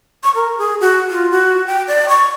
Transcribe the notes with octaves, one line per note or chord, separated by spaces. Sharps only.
C#6
A#4
G#4
F#4
F4
F#4
G5
D5
C#6